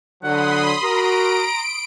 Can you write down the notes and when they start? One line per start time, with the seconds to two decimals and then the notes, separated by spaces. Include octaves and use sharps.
0.23 D3 F#3 F#5 B5 C6 D#6
0.84 F#4 A#4 A#5 D7